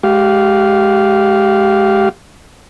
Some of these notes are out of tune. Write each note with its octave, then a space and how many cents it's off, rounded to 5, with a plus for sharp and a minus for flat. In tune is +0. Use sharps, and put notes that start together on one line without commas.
G#3 +20 G4 -20 F5 +0